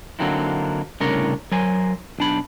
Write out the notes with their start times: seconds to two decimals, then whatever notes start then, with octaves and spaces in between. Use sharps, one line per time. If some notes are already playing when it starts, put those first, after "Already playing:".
0.19 D3 F#3 A#3 C4 D#4 E4
1.00 C2 A2 C#3 D4 A#4 C#5
1.52 F#3 A#4 C5 G#5
2.19 B1 D4 B5